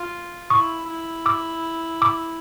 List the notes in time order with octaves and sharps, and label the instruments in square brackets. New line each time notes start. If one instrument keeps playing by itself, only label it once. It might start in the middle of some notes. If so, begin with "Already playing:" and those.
Already playing: [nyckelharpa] F4
[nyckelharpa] E4 [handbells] C#6 D#6
[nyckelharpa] E4
[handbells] D6 E6
D6 E6